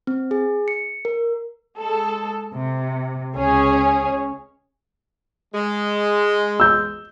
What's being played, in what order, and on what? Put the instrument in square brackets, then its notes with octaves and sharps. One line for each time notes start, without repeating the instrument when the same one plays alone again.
[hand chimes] C4
G#4
C#7
A#4
[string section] G#3 A4
C3
C#2 C#4 G#4 C#5
[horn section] G#3
[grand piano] E6 G6